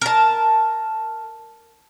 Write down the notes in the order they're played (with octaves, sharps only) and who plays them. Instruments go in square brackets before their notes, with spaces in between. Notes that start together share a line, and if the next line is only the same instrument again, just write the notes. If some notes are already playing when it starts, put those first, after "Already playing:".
[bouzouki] A#4 A5